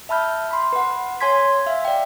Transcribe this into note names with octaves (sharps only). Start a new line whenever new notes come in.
E5 A5 B5 F6 G6
B5 C6
B4 F#5
C#5 G#5 C6 G#6 B6
E5 F5
D5 G5